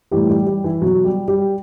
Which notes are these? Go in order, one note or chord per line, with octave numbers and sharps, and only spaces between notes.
A2 E3 G3 G4
G3 G4
G3 G4
E3 E4
B2 F#3 F#4
G3 G4
G3 G4